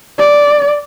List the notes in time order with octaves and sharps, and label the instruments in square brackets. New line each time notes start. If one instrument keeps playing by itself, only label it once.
[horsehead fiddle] D5